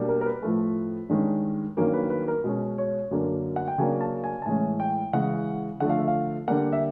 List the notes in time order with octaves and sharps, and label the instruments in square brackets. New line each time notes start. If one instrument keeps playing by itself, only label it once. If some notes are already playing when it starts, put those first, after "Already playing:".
Already playing: [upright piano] B2 G3 A#3 D4
A#4
A#4
B4
A2 F3 A3
G2 D#3 G#3 C#4
G2 D#3 F#3 A#3 C#4
B4
B4
A#4
B2 G#3 C#4
C#5
F#2 D3 F#3 A#3
F#5
G5
C#3 F#3 A#3 D4 G#5
A5
G#5
A5
A2 E3 G#3 C#4 G#5
G5
C#3 E3 G#3 F#5
D3 F3 A3 F#5
F5
E5
F5
D3 G3 A#3 F#5
E5